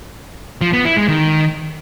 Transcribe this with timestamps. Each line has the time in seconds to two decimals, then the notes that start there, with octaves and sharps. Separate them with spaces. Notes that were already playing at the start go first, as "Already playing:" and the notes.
0.61 F3
0.73 B3
0.85 E4
0.97 G#3
1.08 D#3